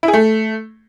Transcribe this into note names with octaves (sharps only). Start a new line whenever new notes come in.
E4
G#4
A3